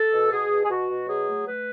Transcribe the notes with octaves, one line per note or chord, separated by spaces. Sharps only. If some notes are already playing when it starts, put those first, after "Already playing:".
Already playing: A4
B2
B2 G#4
B2
G#4
B2 F#4
B2
F#3 G#4
A3
A3 B4